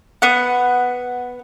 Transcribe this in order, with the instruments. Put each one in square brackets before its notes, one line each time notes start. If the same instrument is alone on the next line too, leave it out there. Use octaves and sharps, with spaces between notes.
[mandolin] B3 F#5